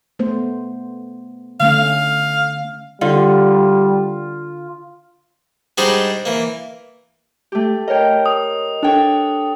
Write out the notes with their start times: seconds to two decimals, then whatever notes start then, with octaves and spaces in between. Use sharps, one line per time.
0.19 A3 B3 C5
1.60 D3 A3 C#4 F5
3.01 D3 G3 F4
5.78 G3 G#3 D4 D#4 F#4 C5
6.25 E3 A#3
7.52 A3 G4
7.88 A#4 C#5 D#5 G5
8.26 D#6
8.83 D4 A4 C#5 G5